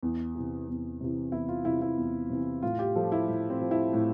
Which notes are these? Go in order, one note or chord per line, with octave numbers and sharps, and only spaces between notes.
E2
C3 E3
E2
C3 E3
E2 E4
F4
C3 E3 E4
E4
E2
C3 E3
A2 F4
G4
F3 A4
E4
A2
C4
F3
E4
A2